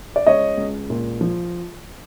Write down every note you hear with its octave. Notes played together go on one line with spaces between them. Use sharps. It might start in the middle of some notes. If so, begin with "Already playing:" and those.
D5
C#2 C#5 D#5
C#2
A#2
F3